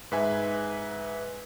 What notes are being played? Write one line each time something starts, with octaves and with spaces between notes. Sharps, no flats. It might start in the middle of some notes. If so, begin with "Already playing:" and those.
G#2 B4 E5 G#5